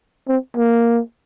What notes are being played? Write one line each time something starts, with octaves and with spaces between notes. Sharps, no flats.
C4
A#3